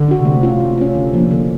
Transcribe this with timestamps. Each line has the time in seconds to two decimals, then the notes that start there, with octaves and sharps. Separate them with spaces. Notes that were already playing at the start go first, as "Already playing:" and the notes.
Already playing: D3
0.08 D4 F#4
0.25 C3 A3
0.43 C#4 F4
0.60 C3 A3
0.78 C#4 F4
0.95 D3
1.13 F3 A#3 D4
1.31 D3